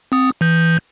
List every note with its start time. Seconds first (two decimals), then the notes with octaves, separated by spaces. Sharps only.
0.12 C4 D#6
0.41 E3 G6